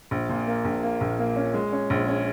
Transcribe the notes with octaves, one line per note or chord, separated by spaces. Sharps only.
A#1
A#2
A#3
A#1
A#3
A#1
A#3
C#4
G#3
C#4
A#1
C#4